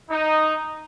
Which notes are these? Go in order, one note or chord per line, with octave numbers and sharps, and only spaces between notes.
D#4